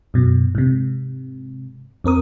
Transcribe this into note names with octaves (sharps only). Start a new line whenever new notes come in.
F#2 B2
G#2 C3
F2 C4 A#4 D#6